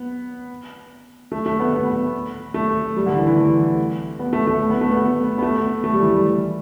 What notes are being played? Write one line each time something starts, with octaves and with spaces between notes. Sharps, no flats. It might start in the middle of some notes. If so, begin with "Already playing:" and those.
Already playing: B3
A3
A3
B3
B3
A3
G3
D3
E3
E3
A3
B3
A3
A3
B3
A3
B3
B3
A3
A3
G3
E3
G3